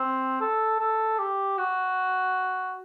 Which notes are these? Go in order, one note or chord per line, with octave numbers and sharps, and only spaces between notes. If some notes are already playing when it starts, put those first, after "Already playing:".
Already playing: C4
A4
A4
G4
F#4